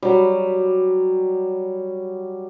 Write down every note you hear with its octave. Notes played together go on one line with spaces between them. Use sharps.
F#3 G3